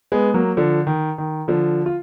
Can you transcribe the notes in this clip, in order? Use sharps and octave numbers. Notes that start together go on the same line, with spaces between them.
G#3 B3
F#3 A#3
D3 F3
D#3
D#3
D3 F3
F4